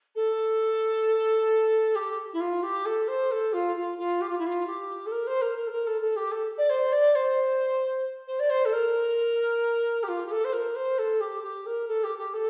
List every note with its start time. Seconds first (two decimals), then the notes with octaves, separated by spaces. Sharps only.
0.15 A4
1.95 G4
2.33 E4
2.40 F4
2.63 G4
2.85 A4
3.07 C5
3.31 A4
3.53 F4
3.76 F4
3.98 F4
4.21 G4
4.29 F4
4.38 E4
4.46 F4
4.66 G4
5.06 A4
5.11 A#4
5.27 C5
5.41 A#4
5.56 A#4
5.66 A4
5.71 A#4
5.86 A4
6.01 A4
6.16 G4
6.31 A4
6.57 D5
6.69 C5
6.92 D5
7.15 C5
8.27 C5
8.39 D5
8.49 C5
8.65 A4
8.72 A#4
10.03 G4
10.08 F4
10.25 G4
10.30 A4
10.44 C5
10.52 A#4
10.75 C5
10.98 A4
11.20 G4
11.43 G4
11.66 A#4
11.87 A4
12.03 G4
12.18 G4
12.33 A4